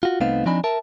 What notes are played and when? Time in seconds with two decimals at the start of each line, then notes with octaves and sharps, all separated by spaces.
0.03 F4 F#4
0.20 C2 A3 B3 C4 D#4 F5
0.46 F3 C4 D4 D#4 G#5 B5
0.64 A#4 E5 A5